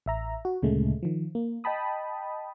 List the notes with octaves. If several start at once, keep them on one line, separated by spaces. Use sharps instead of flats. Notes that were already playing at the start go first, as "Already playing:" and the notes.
A1 E5 A#5
F#4
D2 A#2 C#3 G#3 A3
D#3 F3
A#3
D#5 G5 A5 B5 D#6